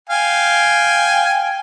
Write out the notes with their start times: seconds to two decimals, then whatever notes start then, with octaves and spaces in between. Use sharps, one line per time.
0.09 F5 G5 G#5